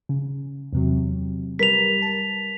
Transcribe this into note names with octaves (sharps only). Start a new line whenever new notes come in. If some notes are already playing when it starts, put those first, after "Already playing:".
C#3
E2 C3 F#3
G3 A#4 B4 B6 F7
A5